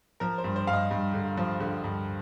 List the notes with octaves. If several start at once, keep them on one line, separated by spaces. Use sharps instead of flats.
F3 A#4
C5
G2
C5
G2 F5
D#5
G2
D3
F3
D3
G2